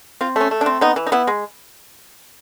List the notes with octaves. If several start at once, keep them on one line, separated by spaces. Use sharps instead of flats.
C4 F4
A3 C#4
A3
D4
C4
B3 D#4
E3
D#4
B3 E4
G#3